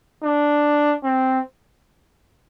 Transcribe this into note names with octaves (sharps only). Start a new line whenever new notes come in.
D4
C4